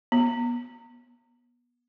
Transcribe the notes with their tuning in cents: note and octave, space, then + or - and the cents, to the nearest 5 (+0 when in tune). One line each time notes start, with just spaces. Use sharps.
B3 -30